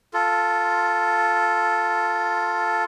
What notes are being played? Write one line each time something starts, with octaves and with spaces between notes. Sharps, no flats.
F4 A4